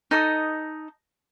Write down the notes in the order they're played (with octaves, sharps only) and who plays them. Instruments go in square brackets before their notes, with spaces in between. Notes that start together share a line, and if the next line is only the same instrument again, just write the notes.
[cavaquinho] D#4 A4 D#5 D#6